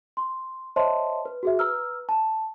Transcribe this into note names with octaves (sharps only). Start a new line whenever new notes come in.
C6
C5 C#5 D#5 E5 A5 C6
B4
F#4 G#4 E5
B4 A#5 E6 F6
A5